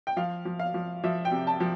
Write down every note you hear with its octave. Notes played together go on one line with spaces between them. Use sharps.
G5
F3 F5
F3
F5
F3
F3 E5
G5
C3
A5
F3